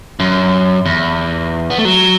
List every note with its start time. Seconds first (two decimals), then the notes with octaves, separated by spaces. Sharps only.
0.20 F#2
0.85 E2
1.70 B3
1.78 A3
1.85 F#3